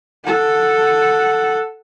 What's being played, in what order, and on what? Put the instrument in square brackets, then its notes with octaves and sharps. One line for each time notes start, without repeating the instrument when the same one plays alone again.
[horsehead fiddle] A4 F#5